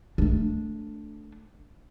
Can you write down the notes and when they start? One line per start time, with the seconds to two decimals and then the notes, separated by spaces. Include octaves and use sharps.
0.18 A3 D4